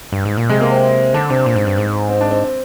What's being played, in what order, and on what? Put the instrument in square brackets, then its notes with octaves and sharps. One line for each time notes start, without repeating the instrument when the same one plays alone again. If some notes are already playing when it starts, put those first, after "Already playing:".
[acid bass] G2
G#2
A#2
[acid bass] C3 [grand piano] G#3
[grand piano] A#3
C4
[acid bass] D3 [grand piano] D4
[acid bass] C3 [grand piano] C4
[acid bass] A#2
G#2
G2
G#2
[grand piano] C4
D4
C4